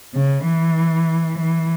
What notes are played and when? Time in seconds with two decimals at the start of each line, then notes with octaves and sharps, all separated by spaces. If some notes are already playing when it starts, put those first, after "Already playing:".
0.15 C#3
0.45 E3
1.39 E3